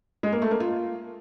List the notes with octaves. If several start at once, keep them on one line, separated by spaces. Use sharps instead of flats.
G#3
A#3
A3
A#3
F4